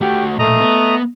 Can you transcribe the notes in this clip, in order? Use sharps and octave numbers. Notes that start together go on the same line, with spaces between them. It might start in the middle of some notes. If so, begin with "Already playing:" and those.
A3 F#4 G4
B1 A#2 A3 D#5 A#5
B3